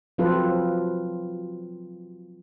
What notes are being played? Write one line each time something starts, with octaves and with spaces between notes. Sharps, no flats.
F3 F#3 C4 F4 A4 B4